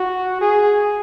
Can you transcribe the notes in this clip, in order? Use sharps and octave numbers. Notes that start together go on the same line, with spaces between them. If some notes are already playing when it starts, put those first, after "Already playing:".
Already playing: F#4
G#4